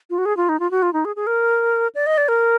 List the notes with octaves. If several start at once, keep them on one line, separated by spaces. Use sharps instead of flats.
F4
F#4
G#4
F4
D#4
F4
F#4
F4
D#4
G#4
G#4
A#4
D5
D#5
D5
A#4